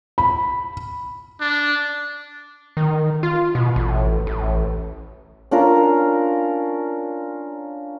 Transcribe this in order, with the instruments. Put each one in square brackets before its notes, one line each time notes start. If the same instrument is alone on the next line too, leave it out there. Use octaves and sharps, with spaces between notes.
[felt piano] B5
[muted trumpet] D4
[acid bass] D#3
F4
B2
A1
A1
[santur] C#4 D4 F4 A#4